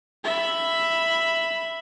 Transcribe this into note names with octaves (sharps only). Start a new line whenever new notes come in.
E5 B5